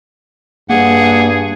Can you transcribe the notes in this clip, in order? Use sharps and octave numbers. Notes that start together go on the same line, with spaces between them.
G2 A#3 G#4 F#5